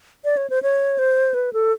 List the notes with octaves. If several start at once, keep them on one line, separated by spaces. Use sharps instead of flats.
D5
C#5
C5
C#5
C5
B4
A4